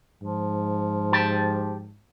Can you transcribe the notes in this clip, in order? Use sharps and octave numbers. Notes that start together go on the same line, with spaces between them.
G#2 F3
G4 G5 A5